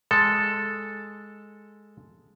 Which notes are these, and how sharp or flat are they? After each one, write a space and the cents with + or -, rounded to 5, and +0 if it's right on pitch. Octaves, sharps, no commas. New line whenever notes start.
G#3 +0 A4 +0